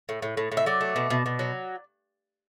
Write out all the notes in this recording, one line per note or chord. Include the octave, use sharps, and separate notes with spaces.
A2
A2
A2
A2
E5
F#3 D5
A3
B2
B2
B2
F#3